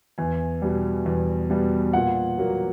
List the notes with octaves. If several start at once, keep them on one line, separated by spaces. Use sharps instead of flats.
E2 G#5
B2 G3
E2
B2 G3
A#2 F#5
F#3 A#3